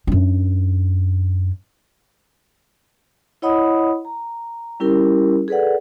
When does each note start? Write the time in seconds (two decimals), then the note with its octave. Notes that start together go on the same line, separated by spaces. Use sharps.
0.07 F#2 D4
3.42 E4 C#5 D#5 F#5 B5 D#6
4.05 A#5
4.80 G3 C#4 E4 G4 A#4
5.48 G#4 A4 B4 D5 F#5